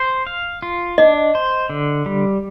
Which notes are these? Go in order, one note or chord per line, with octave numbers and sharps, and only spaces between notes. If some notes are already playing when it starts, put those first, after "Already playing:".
Already playing: C5
F5
F4
D4 D#5
C5
D3
G3